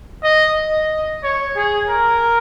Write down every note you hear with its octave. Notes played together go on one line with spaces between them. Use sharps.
D#5
D#5
C#5
G#4
A#4